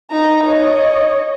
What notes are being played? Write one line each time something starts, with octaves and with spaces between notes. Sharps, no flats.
D#4 A#5
C#5 D#5